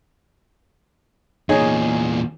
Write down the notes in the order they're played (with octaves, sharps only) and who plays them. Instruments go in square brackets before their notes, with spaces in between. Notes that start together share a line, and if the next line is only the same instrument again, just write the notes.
[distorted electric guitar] E2 A#2 [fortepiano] D#4 G#4 C#5